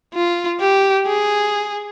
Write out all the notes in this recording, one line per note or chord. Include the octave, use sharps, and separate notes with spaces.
F4
G4
G#4